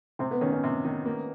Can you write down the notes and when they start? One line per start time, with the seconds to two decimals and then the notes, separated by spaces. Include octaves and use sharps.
0.19 C3 C4
0.31 B3
0.41 D#3 C#4
0.52 C#4
0.64 C3
0.85 D#3
1.06 A#3